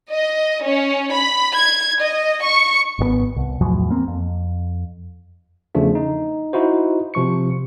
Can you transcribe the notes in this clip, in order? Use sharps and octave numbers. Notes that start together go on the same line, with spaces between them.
D#5
C#4
B5
G#6
D#5
C#6
G#1 B2 B3
C2
E2 A2 F3 F#3
A#3 C4
F2
E2 C#3 F3 A3 D4
D#4
D#4 E4 F#4 C5
C3 F3 C#6 C#7